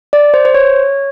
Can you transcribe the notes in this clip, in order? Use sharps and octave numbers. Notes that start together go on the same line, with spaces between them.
D5
C5
C5
C#5